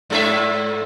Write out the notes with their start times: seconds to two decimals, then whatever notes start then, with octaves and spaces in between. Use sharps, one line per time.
0.10 G#2 A4 E5